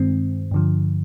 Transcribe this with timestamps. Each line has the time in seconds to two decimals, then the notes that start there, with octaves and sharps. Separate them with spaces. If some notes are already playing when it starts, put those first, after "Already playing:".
Already playing: G2 D#3 G#3 C4
0.51 G2 D3 F3